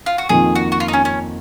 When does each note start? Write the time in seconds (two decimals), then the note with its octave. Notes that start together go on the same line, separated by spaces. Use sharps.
0.06 F4
0.18 F#4
0.29 F2 D#3 A#3 F4 G#4
0.55 F#4
0.72 F#4
0.80 F4
0.88 D#4
0.93 C#4
1.05 C#4